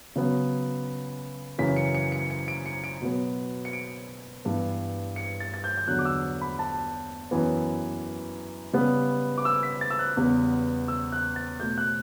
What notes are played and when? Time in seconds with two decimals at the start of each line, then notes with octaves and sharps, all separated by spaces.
0.16 C#3 F#3 B3
1.58 F#2 C#3 E3 B6
1.76 C#7
1.94 C#7
2.12 C#7
2.30 C#7
2.48 D7
2.66 C#7
2.84 D7
3.02 B2 F#3 B3
3.65 C#7
3.73 D7
4.45 G2 E3 G3 B3
5.16 C#7
5.40 A6
5.54 A6
5.64 G6
5.77 G6
5.87 E2 D3 F#3 F#6
5.99 D6
6.05 E6
6.41 B5
6.59 A5
7.31 F#2 E3 B3
8.73 C#3 G3 B3
9.38 D6
9.45 E6
9.63 B6
9.81 A6
9.90 E6
9.99 F#6
10.17 E2 C#3 G3 B3
10.88 E6
11.12 F#6
11.36 A6
11.60 B2 A3 G6
11.78 F#6